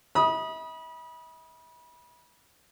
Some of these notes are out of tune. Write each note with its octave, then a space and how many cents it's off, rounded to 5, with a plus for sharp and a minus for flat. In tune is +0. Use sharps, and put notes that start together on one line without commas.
E5 -45 B5 -30 D#6 +0